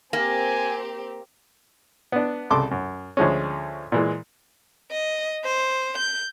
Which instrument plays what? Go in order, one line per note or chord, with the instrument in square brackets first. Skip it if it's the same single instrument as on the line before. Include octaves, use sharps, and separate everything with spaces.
[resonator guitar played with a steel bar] A#3 [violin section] C4 G4 [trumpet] G#5
[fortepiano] B3 D4
C2 C#3 A4 C6 D6
F#2
D2 F3 G#3 C#4
A#2 E3 G#3
[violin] D#5
C5
G6